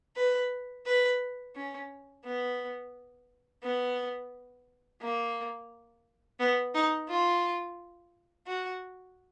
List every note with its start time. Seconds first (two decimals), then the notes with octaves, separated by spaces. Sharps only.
0.16 B4
0.86 B4
1.55 C#4
2.24 B3
3.63 B3
5.01 A#3
6.39 B3
6.74 D#4
7.09 F4
8.47 F#4